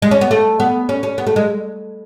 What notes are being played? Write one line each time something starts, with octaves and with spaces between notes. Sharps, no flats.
G#3
C#4
B3
A3
B3
C#4
C#4
B3
A3
G#3